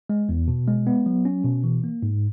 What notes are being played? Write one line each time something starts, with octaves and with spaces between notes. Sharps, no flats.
G#3
E2
B2
G#3
B3
F#3
C#4
B2
E3
A#3
G#2